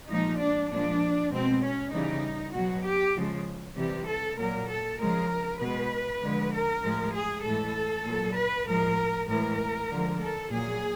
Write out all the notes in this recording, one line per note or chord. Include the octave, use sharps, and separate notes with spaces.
A#2 F3 G#3 D#4
D4
A#2 F3 G#3 D4
B2 G#3 C4
C#4
C#3 E3 G3 D#4
B2 F#3 F#4
G4
C#3 F3 G#3
C3 E3 G3 G4
A4
A#2 F#3 A#4
A4
C#3 F3 G#3 A#4
B2 G#3 B4
D3 F3 G#3
A#4
A2 F3 G#3
G#4
A2 E3 G#3 A4
A#2 F#3
B4
A2 F3 G#3 A#4
A2 E3 G#3 A#4
D3 F3 G#3
A4
A#2 F#3 G#4